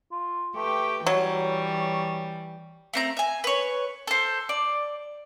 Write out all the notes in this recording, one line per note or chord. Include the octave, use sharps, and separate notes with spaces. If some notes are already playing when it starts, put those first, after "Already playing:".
F4
A3 G4 B4 G5
E3 F#3 G3 C#5
A3 C4 A#5
E5 G#5
B4 C#5
A4 C5
D5